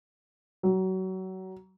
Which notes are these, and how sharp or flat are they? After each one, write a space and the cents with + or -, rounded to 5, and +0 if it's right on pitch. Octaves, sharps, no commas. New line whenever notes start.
F#3 +25